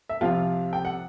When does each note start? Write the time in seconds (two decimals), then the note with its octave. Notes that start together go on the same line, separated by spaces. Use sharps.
0.09 E5
0.21 C2 C3 F3 F4 F5
0.73 G5
0.85 F#5